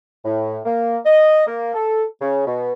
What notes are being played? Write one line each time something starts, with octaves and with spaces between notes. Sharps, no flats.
A2
A#3
D#5
A#3
A4
C#3
B2